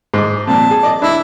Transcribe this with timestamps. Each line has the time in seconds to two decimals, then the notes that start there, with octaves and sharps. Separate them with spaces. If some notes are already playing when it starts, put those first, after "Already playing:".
0.14 G#2 D6
0.47 F2 A#2 A5
0.71 G#4
0.83 D5 D#5 D6
1.02 D4 E4